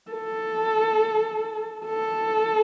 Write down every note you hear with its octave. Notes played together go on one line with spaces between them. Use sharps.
A4
A4